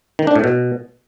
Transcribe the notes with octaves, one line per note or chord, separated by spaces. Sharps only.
D#3
D4
A2
B2